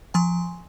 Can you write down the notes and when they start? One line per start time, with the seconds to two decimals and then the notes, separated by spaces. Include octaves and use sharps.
0.14 F3 G#5 C6